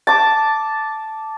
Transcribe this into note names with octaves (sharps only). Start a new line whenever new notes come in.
A5 D6